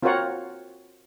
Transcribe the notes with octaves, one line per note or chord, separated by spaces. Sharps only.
C4 F4 F#4 A#4 C#5 F#5